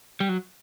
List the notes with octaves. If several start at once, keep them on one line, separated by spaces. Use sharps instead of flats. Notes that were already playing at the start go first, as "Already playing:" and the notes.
G3
F#3